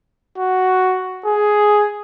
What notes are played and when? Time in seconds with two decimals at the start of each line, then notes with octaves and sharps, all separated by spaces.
0.38 F#4
1.25 G#4